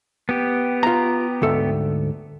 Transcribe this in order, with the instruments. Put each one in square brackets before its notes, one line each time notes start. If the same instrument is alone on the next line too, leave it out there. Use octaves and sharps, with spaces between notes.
[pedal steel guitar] B3 G4
[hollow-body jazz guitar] F4 A#5
D2 G#2 A4